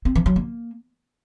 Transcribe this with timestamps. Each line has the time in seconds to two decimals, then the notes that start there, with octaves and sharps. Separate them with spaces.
0.05 C4
0.16 E3
0.26 F#3
0.36 A#3